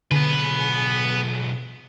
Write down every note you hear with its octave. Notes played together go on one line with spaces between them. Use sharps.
B1 D3 B3 G#4 B4